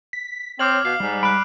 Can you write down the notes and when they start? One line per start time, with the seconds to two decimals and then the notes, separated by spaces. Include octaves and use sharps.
0.13 B6
0.59 C4 C#5 D6 F6 F#7
0.85 B2 F5 C7
1.00 G#2 G3
1.23 B5 F#6 D7